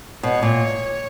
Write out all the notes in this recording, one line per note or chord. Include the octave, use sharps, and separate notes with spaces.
B2 C#5
A#2